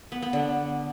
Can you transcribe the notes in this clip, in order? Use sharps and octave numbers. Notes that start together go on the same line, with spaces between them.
B3
B3
D3